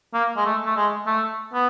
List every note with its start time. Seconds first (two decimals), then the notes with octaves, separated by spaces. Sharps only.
0.14 A#3
0.37 G#3
0.45 A3
0.65 A3
0.76 G#3
1.06 A3
1.53 B3